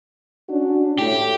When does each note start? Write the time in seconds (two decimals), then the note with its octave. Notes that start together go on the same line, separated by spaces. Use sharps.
0.49 C#4 D4 F#4
0.98 A2 G4